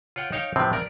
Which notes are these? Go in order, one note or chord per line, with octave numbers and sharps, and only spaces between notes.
F4 C#5 F#5 G5
D#4 C#5 F5 G5
A2 C3 F3 B3 C4
A#4 D5